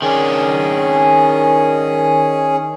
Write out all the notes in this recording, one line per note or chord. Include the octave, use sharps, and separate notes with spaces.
D#3 C#4 D4 G#4